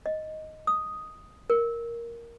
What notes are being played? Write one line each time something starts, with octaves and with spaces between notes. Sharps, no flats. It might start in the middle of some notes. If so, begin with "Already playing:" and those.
D#5
D#6
A#4